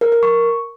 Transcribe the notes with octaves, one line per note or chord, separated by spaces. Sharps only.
A#4
A#4
C#6